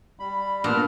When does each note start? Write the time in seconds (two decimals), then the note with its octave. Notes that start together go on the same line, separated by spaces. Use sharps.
0.19 G3 B5
0.64 A#2 B3 D4 F#5 F6